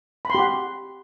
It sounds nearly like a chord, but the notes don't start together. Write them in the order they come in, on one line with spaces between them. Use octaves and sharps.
B5 C6 G4 F#5